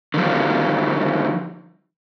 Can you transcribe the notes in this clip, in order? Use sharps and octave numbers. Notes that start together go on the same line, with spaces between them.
D3 D#3 F3 G3